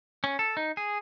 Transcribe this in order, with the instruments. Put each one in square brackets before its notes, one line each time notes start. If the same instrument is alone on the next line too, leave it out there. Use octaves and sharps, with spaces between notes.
[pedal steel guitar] C#4
A4
D#4
G#4